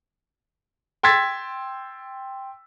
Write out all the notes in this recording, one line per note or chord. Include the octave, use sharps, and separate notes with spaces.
G5 C6 E6 G#6 A6 B6